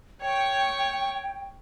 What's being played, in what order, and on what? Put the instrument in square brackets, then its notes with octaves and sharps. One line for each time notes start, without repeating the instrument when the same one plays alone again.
[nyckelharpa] C#5 C#6 [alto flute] G5